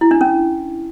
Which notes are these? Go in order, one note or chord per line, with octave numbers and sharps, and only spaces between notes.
E4
D4
C#4